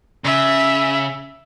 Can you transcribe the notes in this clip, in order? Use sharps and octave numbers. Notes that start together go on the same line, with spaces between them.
C#3 E5